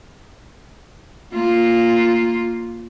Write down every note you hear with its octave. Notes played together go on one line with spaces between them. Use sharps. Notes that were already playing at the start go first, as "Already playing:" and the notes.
A#3 F4